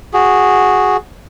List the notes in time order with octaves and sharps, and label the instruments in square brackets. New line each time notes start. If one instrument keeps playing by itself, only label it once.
[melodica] F#4 G#4